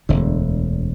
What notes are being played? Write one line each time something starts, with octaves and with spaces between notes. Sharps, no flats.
E1 D2 D3